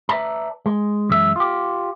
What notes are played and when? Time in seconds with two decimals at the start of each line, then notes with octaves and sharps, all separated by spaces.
0.09 B4 D5 E5 A5 A#5
0.66 G#3
1.09 F#2 E3 G#3 E5
1.36 F4 G4